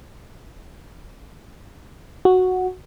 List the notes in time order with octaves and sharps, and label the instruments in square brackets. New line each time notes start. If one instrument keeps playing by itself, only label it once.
[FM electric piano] F#4